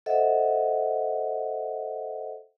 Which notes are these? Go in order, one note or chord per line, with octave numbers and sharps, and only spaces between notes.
A4 C5 D#5 E5 F#5